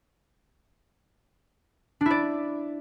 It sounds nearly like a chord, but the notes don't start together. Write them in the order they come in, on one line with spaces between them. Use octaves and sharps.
D4 E4 D5